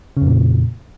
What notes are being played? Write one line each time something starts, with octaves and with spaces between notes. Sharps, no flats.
F2 A#2 C#3